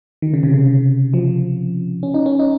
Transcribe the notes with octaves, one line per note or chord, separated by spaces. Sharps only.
D#3
C#3
C3
C#3
F3
C#4
D#4
C#4
D#4